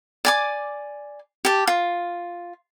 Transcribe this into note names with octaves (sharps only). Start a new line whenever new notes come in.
D5 G#5 D6
G4 A5
F4